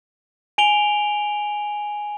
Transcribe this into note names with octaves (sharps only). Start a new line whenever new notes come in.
G#5 D7 F7 G7